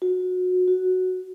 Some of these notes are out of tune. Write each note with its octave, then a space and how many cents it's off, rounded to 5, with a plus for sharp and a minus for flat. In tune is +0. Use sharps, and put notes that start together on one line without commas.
F#4 -25
F#4 +0